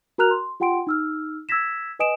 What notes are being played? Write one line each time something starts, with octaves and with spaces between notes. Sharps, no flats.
F#4 A#4 A#5 F6 F#6 F7
C6
F4 G4 F#5 G5 C6 D7
D#4 E6 F6
E6 G#6 A#6 B6 E7
B4 D#5 G#5 D#6 D7 E7